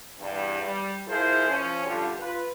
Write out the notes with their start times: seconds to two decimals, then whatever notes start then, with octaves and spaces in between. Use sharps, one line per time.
0.19 E2 G2
0.62 G3
1.07 F3 E4 G#4 A#4 C5
1.48 F3 C#4
1.85 G2 D3 F4 G4
2.20 F4 B4